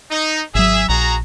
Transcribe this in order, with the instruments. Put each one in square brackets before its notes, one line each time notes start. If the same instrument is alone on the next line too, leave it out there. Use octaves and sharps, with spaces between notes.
[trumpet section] D#4
[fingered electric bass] G#1 F#3 [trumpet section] G#4 E5
[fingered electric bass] A#1 [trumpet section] F#4 G#4 A#5